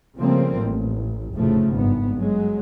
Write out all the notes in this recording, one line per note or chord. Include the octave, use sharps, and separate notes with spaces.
C#3 F3 G3 A3 A#3 C4
A1
F1 A2 C#3 F3 A3
G#1 G2 B3
F#3 G#3